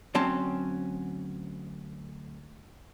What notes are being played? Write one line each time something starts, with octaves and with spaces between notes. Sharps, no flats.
D2 F#3 C4 C#4 A5